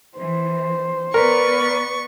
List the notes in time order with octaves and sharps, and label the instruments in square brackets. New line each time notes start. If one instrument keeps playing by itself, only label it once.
[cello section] E3 [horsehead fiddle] C5
[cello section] B3 B4 D5 [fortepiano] A#4 [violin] C#6